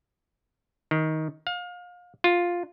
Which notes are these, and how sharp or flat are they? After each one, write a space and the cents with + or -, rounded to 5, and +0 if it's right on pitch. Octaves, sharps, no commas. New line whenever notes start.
D#3 +15
F5 +30
F4 +5